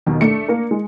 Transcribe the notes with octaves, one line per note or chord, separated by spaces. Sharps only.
D#2 B2 D#3
A3 D4 C#7
A#3 A#4
G#3